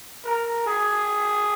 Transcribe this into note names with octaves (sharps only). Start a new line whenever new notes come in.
A#4
G#4